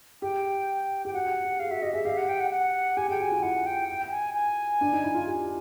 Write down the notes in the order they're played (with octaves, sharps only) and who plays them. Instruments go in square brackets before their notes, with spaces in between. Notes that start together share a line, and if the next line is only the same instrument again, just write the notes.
[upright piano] G4 [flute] G5
[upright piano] G4 [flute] G5
[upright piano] F#4 [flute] F#5
[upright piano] G4
G4
[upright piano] G#4 [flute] F5
[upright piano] F#4 [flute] E5
[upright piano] G4 [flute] D#5
[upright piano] G#4 [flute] E5
[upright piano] G4 [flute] F5
[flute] F#5
G5
F#5
F#5
[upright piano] G4 [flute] G#5
[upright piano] G#4 [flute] G5
[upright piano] F#4 [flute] G#5
[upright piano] F4
[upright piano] E4 [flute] F#5
[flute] G5
G5
G5
G#5
G#5
[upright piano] D4
D#4
E4
F4
G4